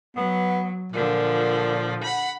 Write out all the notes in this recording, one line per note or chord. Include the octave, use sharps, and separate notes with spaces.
F#3 B3
A#2 D3 F3
F#5 B5